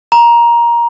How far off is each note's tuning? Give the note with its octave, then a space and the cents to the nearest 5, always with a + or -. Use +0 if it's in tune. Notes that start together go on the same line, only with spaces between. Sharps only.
A#5 +15